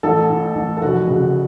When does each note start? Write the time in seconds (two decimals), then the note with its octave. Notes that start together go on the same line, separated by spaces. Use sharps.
0.03 A1 A4
0.30 A2
0.56 A1
0.77 A4
0.81 F1 F#4
1.08 C#3 F#4